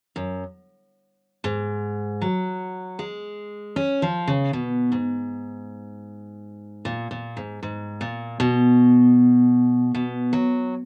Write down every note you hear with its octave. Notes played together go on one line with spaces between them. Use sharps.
F#2
G#2
F#3
G#3
C#4
F3
C#3
B2
G#2
A#2
A#2
G#2
G#2
A#2
B2
B2
F#3